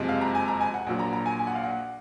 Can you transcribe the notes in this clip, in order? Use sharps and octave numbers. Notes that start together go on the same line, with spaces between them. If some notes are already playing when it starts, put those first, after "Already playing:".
Already playing: F#1 F2 C3 F3 G#3
F5
A#5
G#5
A#5
G#5
F#5
A#1 A#2 F#3 F#5
A#5
A#5
G#5
G#5
F#5
F5
F#5